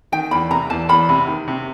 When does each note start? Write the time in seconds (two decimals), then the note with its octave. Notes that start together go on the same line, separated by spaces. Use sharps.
0.12 D#3 G5
0.31 E2 B5
0.50 C3 A#5
0.70 E2 A5
0.89 E2 B5
1.09 C3
1.27 D#3
1.48 C3